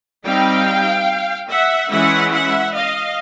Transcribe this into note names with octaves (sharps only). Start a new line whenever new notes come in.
G3 C4 D#4 F5 G5
E5 F#5
E3 G#3 C#4 E4 E5 F#5
E5 F#5
D#5 F5